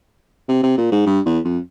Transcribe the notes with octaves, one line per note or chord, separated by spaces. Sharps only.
C3
C3
A#2
G#2
G2
E2
F2